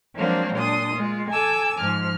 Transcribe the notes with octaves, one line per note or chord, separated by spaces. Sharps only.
F3 F#3 G#3 A#3 C4 D4
A#2 D4 C6 D#6
G#3 F4
A4 G#5 A5 D6 E6
G#2 F3 F6